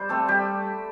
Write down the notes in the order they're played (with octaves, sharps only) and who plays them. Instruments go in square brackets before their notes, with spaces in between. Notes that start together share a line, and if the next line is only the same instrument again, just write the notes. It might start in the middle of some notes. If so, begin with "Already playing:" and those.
Already playing: [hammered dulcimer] G3 C5 D5
A3 C4 A4
G3 G4